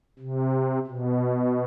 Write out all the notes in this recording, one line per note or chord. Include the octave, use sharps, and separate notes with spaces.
C3
B2